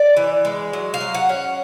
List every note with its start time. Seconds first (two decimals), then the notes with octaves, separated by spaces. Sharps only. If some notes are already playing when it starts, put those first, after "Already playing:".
Already playing: D5
0.16 E3
0.45 G#3
0.73 F#3
0.94 F5
1.01 F#3
1.14 F#5
1.29 C#4